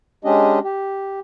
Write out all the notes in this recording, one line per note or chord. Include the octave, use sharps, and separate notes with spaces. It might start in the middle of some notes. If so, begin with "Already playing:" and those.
G#3 C#4 D4 G4 D#5
G4